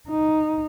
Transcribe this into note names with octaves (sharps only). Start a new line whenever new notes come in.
D#4